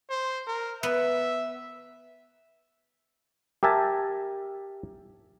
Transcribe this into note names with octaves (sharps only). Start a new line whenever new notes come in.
C5
A#4
B3 E5
G4 A#4 E5 G#5 A5